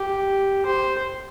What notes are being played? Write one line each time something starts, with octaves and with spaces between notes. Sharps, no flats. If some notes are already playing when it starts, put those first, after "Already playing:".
Already playing: G4
C5